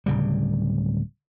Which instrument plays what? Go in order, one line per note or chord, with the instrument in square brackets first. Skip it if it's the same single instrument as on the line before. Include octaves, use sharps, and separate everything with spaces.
[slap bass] D1 C#3 G3